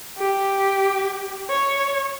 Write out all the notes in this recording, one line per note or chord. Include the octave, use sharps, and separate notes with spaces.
G4
C#5